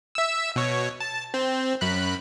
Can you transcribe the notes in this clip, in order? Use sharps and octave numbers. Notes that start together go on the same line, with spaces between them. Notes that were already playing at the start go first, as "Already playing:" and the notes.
E5 E6
B2 C#5
A5
C4
F#2 B5 F#6